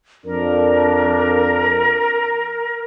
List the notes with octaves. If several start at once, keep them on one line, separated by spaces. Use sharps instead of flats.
F2 D4 A#4